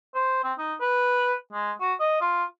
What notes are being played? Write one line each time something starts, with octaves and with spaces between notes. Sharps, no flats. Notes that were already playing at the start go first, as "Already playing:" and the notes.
C5
C4
D#4
B4
G#3
F#4
D#5
F4